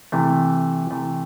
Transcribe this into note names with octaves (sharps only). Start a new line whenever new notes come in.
C3 E3 A3
C3 E3 A3